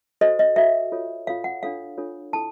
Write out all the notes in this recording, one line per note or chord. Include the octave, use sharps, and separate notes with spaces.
F#4 A4 C5 D#5
D#5
F#4 A4 C5 E5
F4 A4 C#5
F4 A4 C#5 F5
F#5
D4 F4 A4 C#5 F5
D4 F4 A4 C#5
E4 A4 A5